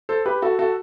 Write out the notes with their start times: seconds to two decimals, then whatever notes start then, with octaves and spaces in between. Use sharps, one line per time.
0.09 A4 C5
0.26 G4 B4
0.42 F#4 A4
0.59 F#4 A4